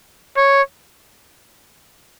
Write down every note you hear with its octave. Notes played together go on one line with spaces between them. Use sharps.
C#5